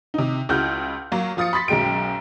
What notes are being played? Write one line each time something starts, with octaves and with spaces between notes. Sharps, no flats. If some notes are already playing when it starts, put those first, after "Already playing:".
C3 D#4
C#2 G#3 E4 F#4 F6 G6
F#3 A#3
F3 F4 D#6 A6 C#7
B5 C6 A6 B6
B1 F#2 G#3 G5 D7